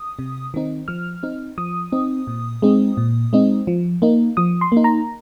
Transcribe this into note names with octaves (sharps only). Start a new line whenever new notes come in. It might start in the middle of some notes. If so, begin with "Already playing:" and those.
Already playing: D#6
C3
D#3 C4 D#4
F3 F6
C4 D#4
F3 D#6
C4 D#4
A#2
G#3 C4 D#4
A#2
G#3 C4 D#4
F3
A#3 D#4
F3 D#6
C6
A#3 D#4
A#5